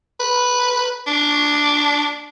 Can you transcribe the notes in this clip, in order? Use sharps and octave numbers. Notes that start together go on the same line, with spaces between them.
B4
D4